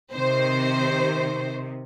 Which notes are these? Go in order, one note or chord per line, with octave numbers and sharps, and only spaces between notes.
C3 D#3 C5